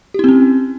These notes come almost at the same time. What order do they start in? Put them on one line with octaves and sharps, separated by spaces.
G4 E4 C4 C#4